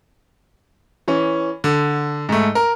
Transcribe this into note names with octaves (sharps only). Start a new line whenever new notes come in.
E3 C#4
D3
G#2 A3
A#4